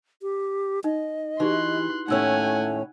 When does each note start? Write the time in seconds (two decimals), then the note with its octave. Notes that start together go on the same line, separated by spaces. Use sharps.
0.22 G4
0.84 D#4 D#5
1.40 E3 D#4 F#4 G4 C6 F#6
2.08 D#2 A2 A3 C#4 D#4 F#5 G#5 E6